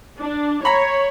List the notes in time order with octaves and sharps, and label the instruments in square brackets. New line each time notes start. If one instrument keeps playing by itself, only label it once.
[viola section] D4
[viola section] C#5 [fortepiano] A#5 B5